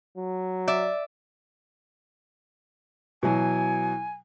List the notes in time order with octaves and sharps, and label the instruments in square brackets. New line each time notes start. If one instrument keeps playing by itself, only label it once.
[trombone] F#3
[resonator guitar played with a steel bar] D5 E5
[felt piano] B2 E3 F#3 [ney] G#5